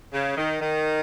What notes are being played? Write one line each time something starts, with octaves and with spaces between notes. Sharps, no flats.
C#3
D#3
D#3